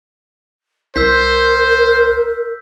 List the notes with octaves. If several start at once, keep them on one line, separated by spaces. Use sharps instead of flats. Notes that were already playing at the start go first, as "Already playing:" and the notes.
C2 A#4 C5 E6 G6 B6